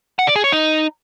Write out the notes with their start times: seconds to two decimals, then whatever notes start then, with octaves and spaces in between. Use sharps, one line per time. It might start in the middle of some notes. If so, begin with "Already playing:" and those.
0.19 F#5
0.27 D5
0.36 G#4
0.44 C#5
0.52 D#4